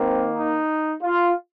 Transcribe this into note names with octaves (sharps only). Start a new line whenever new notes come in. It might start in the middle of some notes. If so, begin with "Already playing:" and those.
Already playing: D#3 A#3 C4
D#4
F4